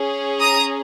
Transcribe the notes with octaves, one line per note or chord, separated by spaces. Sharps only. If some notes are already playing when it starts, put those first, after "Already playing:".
Already playing: C#4 G#4
A#5 D#6